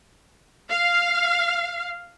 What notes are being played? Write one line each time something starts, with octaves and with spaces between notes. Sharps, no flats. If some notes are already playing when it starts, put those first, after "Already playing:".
F5